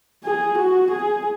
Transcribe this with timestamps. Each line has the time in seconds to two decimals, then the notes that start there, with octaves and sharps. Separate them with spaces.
0.24 G#4
0.58 F#4
0.91 G#4